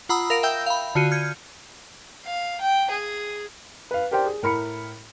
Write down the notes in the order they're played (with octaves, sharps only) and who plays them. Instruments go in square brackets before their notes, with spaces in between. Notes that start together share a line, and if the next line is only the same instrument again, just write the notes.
[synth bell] F4 F#5 A#5 B5 D#6 E6
A#4 F5 A#6 D7
E5 G5 E6 G6
F5 B5
D3 F4 F#4 C#7 D#7
F6 G6 G#6 C#7
[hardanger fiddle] F5
G5
G#4
[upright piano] B4 F5
G4 A#4 C5 D5 G5
G#4
A2 A#4 B5 C#7